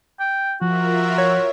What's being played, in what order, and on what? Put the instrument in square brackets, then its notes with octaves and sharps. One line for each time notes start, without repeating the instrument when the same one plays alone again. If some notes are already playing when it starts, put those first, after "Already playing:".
[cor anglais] G5
[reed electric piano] F3 [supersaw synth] F4 A#4 E5 [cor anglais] F#4
[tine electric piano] C#5